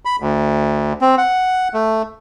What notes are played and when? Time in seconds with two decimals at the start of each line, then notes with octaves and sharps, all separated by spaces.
0.05 B5
0.20 D2
1.02 C4
1.18 F#5
1.74 A3